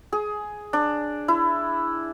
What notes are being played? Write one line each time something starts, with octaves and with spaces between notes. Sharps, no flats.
G#4
D4
E4